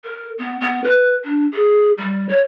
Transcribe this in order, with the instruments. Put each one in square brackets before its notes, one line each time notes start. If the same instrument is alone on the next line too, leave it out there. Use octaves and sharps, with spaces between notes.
[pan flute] A#4
B3
B3
B4
D4
G#4
G3
C#5